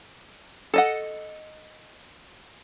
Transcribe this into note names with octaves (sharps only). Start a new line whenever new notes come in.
A4 D#5 F#5